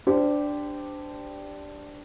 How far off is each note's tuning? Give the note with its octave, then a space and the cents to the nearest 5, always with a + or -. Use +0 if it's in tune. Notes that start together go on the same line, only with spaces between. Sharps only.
D4 +0 G4 +0 C5 -25